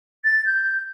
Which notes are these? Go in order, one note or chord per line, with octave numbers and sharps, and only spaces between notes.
A6
G6